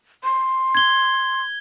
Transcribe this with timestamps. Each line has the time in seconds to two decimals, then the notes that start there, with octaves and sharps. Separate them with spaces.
0.24 C6
0.75 G#6 G7